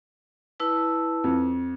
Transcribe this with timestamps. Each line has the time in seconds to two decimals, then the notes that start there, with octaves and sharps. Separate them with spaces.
0.60 E4 B4 A5
1.24 F2